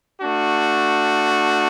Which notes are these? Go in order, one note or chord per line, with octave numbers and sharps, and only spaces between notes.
A3 D4 F#4